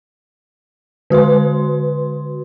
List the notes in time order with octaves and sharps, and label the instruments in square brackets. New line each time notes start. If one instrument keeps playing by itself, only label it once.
[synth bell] D3 F#4 B4 C6